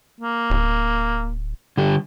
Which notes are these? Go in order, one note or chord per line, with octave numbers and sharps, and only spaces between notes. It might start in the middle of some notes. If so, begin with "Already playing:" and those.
A#3
D1
D3 G3 G4